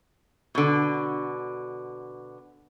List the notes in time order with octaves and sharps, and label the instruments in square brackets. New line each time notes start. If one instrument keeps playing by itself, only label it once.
[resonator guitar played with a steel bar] B2 D3